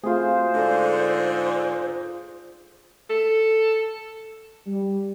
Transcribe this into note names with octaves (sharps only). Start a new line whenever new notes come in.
A3 C4 F4 F#4 G#4 C5
G#2 D3 D4 A4 D5
A4
G3